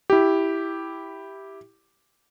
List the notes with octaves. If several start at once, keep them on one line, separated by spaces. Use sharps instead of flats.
E4 G4